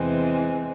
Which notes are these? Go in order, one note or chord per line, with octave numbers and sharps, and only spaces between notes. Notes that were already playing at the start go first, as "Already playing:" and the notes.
Already playing: E2 C3 E3 G#3 C4